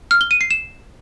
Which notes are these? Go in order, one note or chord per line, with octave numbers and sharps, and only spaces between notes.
F6
G7
D#7
C7
E7